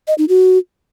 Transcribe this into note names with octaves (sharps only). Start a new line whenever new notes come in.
D#5
D#4
F#4